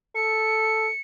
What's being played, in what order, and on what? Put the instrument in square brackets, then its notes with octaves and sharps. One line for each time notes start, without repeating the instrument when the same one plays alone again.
[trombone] A4 [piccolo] C#7